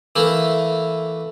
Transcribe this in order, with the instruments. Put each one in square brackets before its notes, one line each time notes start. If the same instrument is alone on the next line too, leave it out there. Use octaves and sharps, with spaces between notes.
[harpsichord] E3 A3 A#3